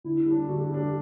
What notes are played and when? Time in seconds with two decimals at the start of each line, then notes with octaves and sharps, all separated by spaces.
0.04 D3 E4
0.26 G3 D4
0.48 D3 F#4
0.59 G4
0.70 G3 D4 G4
0.81 G4